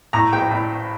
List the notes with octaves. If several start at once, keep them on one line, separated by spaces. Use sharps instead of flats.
A2 A#5
A#1 G5
A2